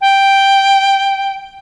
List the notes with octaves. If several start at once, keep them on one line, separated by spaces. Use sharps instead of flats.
G5